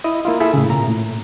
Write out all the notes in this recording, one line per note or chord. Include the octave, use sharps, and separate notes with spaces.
E4 D#5
A#3 E4 F4
E4 G#4 A4 E5
A2 C#3
A#2 A#5
A2